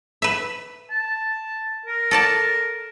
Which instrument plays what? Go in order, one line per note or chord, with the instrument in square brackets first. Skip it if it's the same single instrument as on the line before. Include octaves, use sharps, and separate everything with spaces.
[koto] B4 E5
[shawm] A5
A#4
[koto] A4 D5 A5